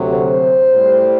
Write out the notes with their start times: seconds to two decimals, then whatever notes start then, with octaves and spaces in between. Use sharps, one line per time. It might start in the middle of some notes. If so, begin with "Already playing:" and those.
Already playing: D2 C3 F#3 A3
0.11 C5
0.73 A2 G3